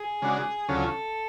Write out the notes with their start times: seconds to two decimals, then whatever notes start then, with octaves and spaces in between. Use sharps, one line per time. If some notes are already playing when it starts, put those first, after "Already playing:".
Already playing: G#4
0.22 C#3 G#3 D4 F#4
0.68 D2 C#3 F#3 C#4 F4 A4